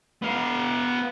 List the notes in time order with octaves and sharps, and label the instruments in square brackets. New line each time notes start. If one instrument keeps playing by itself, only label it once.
[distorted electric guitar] B3 F5